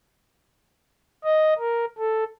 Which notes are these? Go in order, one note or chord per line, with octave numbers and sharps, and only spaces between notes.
D#5
A#4
A4